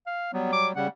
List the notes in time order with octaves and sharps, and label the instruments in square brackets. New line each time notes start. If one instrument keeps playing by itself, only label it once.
[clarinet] F5
[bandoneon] F#3 G3 [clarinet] B3
[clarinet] D6
[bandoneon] C#3 G3 [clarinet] F#5